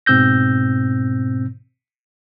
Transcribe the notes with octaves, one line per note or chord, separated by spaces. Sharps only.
G#2 B2 C4 E6 G6 A#6